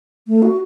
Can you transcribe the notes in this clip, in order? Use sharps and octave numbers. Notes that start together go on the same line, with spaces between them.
A3
F#4